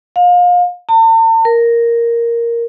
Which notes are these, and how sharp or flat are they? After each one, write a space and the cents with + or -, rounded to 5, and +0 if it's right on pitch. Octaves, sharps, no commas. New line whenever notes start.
F5 +30
A5 +45
A#4 +0